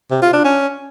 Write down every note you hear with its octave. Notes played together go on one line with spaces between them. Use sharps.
C3
F4
D4
C#4